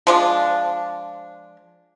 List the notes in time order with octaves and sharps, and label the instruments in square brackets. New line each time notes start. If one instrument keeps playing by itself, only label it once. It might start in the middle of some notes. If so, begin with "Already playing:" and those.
[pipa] F3 G#3 D4